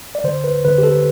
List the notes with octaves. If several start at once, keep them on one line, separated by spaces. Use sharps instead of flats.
D5
D3 C5
B4
D3 B4
G4
A4